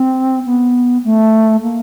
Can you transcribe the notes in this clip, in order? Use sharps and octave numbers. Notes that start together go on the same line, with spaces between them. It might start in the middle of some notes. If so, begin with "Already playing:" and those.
Already playing: C4
B3
A3
A#3